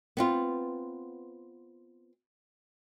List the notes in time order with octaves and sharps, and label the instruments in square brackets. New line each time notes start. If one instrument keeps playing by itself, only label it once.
[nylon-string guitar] B3 C4 F4